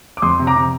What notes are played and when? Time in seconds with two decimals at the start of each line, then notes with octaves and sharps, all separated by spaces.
0.17 D6
0.22 F2 C6 D#6
0.39 C3
0.47 A#5 D6
0.55 C3